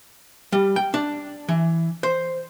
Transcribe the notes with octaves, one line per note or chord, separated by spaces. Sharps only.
G3
G5
D4
E3
C5